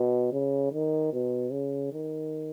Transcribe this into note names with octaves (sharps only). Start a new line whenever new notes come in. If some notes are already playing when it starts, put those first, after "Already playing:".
Already playing: B2
C#3
D#3
B2
C#3
D#3